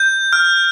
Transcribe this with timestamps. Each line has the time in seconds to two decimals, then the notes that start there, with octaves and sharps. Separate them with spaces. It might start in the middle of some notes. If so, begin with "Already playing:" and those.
Already playing: G6
0.33 F6